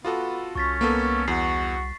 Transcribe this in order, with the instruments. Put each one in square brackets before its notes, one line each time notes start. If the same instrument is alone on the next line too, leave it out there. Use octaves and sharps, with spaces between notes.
[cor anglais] B3 [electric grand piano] F4 F#4 A4
[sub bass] C2 [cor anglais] C#4 [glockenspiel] C#6 A6 B6
[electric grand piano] A#3 B3 A4
[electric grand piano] E2 [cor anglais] F#4 [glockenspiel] C7